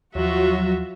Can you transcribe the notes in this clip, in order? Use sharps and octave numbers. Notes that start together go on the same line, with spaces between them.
D#2 F3 F#3 F4 F#4 E5